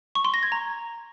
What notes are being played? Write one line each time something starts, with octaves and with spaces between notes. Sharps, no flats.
C#6
C6
A#6
G#6
A#5